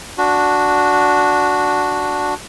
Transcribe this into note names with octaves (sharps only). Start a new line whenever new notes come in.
D4 F#4